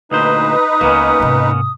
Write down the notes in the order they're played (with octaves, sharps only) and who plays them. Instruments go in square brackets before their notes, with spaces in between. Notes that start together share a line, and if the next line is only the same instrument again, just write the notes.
[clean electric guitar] D2 A#2 C5 [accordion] D#4 B4 [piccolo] D#6
[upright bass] C#2 [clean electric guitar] A#3 B3 C#4
[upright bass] G#2 C3